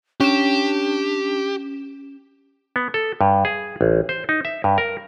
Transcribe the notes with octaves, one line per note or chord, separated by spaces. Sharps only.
C#4 D4 G4 E7
B3
A4
G2
G#4
A1
C5
D#4
E5
G2
A#4